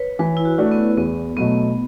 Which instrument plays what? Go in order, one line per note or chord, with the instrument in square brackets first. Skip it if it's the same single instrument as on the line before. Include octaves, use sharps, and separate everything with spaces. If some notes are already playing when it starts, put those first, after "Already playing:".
Already playing: [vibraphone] B4 C#5
[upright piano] E3 [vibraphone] B4
[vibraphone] E4
F#4
[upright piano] A3 D4 F#4
[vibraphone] B3
[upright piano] E2 [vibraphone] B3
[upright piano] B2 F#3 A3 [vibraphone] B3